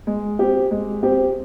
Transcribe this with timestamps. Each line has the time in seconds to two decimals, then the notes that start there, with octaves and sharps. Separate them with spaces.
0.07 G#3
0.39 C4 G4
0.71 G#3
1.03 C4 G4